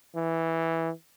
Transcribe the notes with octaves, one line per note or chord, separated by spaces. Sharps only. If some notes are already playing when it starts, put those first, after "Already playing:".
E3